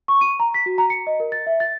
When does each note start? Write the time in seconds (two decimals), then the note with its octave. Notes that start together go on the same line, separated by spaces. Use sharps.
0.08 C#6
0.21 D#7
0.40 A#5
0.54 B6
0.66 F#4
0.78 A#5
0.90 C#7
1.07 D#5
1.20 A#4
1.32 A6
1.47 E5
1.60 A6